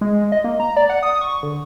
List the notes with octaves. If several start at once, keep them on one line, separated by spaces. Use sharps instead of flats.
G#3
D#5
A#3
A#5
D5
F#5
D#6
C#6
D3